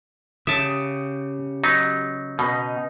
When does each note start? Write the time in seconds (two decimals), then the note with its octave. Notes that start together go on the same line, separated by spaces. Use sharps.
0.47 C#3 G4 E5 A5 D#6
1.64 F#3 B3 D#4
2.39 B2 D#4 B4 D#5